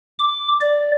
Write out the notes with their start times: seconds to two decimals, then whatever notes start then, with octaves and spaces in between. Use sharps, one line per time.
0.19 D6
0.61 D5